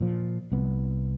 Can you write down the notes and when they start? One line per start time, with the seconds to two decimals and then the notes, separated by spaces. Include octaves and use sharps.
0.01 A#2 F3
0.52 C2 B3